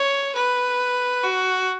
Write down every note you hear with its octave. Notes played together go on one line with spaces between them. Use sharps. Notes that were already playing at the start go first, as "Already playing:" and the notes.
Already playing: C#5
B4
F#4